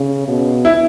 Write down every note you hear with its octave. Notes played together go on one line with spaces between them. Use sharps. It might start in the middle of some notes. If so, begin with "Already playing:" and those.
Already playing: C#3
B2
E4